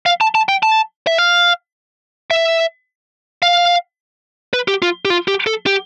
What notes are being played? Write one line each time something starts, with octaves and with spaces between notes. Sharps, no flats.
F5
A5
A5
G5
A5
E5
F5
E5
F5
B4
G4
F4
G4
F4
G4
A4
G4